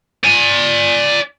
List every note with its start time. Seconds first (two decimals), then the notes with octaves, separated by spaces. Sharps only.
0.24 D5 G#5